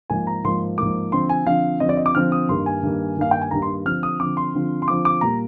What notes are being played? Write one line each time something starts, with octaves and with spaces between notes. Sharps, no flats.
G#2 F3 A#3 G#5
A#5
G#2 F3 A#3 C6
G#2 F3 A#3 D6
D3 F3 C4 C6
G#5
D3 F3 C4 F5
D3 F3 C4 D#5
D5
D#5
D6
D3 F3 C4 F6
D#6
G2 D#3 A#3 C6
G#5
G2 D#3 A#3
G2 D#3 A#3 F5
G5
G#5
G2 D#3 A#3 A#5
C6
D3 F3 C4 F6
D#6
D3 F3 C4 D6
C6
D3 F3 C4
C6
D3 F3 C4 D6
D6
A#2 G3 A#3 A#5